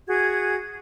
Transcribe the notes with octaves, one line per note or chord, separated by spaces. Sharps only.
F#4 G#4 G#6